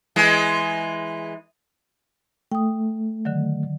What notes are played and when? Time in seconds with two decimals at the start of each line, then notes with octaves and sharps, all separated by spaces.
0.16 E3 G#3
2.52 A3 G5 D#6
3.25 D3 D#3 F#3